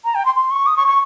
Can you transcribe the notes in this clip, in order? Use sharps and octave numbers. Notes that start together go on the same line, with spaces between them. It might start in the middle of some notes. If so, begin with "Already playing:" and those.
A#5
G5
C6
C6
C#6
D#6
C#6
C#6